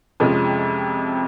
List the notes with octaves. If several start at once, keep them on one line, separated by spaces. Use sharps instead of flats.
F2 C3 F3 G#3 C#4